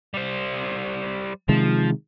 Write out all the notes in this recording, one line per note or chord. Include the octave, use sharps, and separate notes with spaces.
G3 C5
C3 D#3 F3 G#3